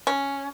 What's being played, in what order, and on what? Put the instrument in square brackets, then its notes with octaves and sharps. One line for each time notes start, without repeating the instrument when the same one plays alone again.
[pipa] C#4